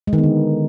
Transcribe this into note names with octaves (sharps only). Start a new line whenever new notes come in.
G#3
D#3
B3
D3